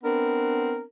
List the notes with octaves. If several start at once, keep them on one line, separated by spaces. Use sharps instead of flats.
B3 C4 D4 A#4